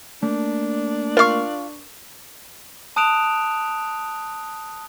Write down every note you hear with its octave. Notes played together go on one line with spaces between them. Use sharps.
A3 A#3 D4
F4 A#4 F5 C#6
A5 D#6 F#6 D7 E7 F7